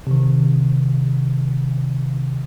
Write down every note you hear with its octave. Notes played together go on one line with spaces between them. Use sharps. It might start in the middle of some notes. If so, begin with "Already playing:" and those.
C3 D#3